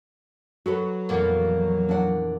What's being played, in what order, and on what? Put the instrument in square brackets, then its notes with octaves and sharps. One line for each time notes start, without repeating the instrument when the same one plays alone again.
[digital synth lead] F#3 [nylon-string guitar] F#4 A4 B4
[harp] F2 A#2 E3 [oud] A#3 B3
[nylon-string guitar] D4 F#5